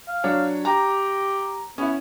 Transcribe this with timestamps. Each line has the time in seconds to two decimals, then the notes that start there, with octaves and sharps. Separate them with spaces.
0.08 F5
0.24 F#3 D4 C#5
0.65 G4 G5 A#5
1.78 B3 C#4 E4